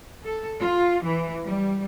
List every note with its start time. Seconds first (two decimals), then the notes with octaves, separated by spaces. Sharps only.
0.24 A4
0.60 F4
1.03 E3
1.45 G3